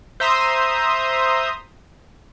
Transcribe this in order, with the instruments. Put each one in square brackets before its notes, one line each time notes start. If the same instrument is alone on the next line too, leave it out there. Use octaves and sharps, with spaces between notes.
[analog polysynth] C5 E5 A#5 C6 D#6